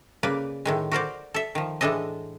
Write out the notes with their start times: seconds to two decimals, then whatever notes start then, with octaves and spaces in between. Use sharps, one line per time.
0.23 C#3 A#3 B4 D5
0.65 A2 D#3 G#3
0.91 F#4 A#4 C5 D5
1.34 A4 E5
1.55 D#3 F3
1.81 A2 E3 G#3 D4 A4 D#5